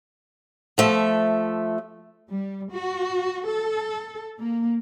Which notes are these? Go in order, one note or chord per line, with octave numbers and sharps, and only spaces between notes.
F3 A3 E5
G3
F#4
A4
A#3